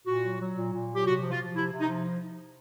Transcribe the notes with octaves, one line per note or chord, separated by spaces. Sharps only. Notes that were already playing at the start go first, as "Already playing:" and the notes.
A#2 F#4
F#3
F#3
A#2
A#2
F#3
G4
C3 F#4
F3
F4
F3
C3 E4
C3
D#4
F3